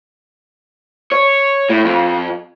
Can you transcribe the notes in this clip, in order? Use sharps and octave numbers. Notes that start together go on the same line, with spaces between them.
C#5
A2
F2